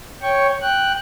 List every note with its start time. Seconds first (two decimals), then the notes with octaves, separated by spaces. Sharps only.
0.22 C#5 G5 C#6
0.61 G5 F#6